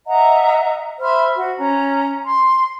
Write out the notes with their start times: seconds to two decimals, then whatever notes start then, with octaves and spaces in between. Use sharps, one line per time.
0.07 D#5 E5 F#5 A#5
1.00 C5 E5 B5 F6
1.36 F#4
1.58 C#4 A#5
2.24 C6